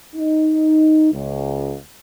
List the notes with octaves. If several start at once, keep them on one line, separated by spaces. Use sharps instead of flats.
D#4
C#2